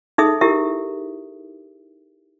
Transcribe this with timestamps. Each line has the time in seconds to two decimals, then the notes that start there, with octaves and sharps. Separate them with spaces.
0.18 D#4 G#4 A4 E5 D#6
0.41 E4 G4 A#4 E5